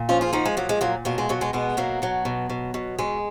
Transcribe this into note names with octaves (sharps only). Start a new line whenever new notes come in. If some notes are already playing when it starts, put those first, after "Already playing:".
Already playing: A#2
F3 C#4 F4
F4 G#4
F3 D#4 F#4
G#3
A#2 F#3
G#3
A#2 F#3 A#3
B2 F#3 A#3
G#3
B2 F#3
G#3 B3
B2 G#3 B3
B2 F#3 A#3
B2 F#3
B2
B2
B2
B2 G#3